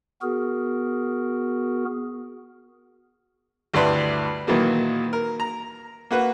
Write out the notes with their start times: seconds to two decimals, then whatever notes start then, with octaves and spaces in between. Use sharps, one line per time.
0.22 B3 F#4 G#4 A#4
3.74 D2 G2 E4 B4 D5 C6
4.47 A#2 D#3 E3 F#3 A#3
5.13 A#4
5.40 A#5
6.11 A#3 F#4 B4